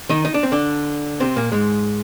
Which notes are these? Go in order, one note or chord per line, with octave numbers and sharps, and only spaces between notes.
D#3 D#4
D#4
D4
C4
D3 D4
C3 C4
A#2 A#3
G#2 G#3